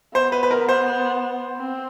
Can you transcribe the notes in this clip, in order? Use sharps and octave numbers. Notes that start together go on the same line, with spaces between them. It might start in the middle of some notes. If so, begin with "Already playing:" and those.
B3 C5
B4
B4
A#4
C5
C4